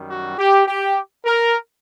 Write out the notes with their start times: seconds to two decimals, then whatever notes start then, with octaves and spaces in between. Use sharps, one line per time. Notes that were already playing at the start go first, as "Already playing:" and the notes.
Already playing: F#2 D#3 G3
0.08 F#4
0.38 G4
0.67 G4
1.26 A#4